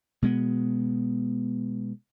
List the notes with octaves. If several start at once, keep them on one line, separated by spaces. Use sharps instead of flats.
B2 G#3 B3